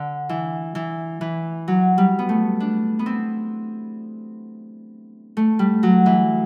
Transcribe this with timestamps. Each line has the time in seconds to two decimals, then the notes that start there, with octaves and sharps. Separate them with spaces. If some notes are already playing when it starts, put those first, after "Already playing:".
Already playing: D3
0.29 E3
0.75 E3
1.21 E3
1.68 F#3
1.98 G3
2.19 B3
2.29 A3
2.60 D4
2.99 B3
3.06 C4
5.37 A3
5.59 G3
5.83 F#3
6.06 E3